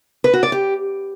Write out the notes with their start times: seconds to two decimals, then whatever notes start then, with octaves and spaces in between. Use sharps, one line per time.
0.24 B4
0.33 F#4
0.43 D5
0.52 G4